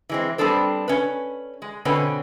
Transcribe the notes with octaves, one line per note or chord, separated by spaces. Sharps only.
E3 G#3 C4
G3 B3 C4 D4 A4 C5
C#4 B4
G#3
B2 D3 C4 C#4 B4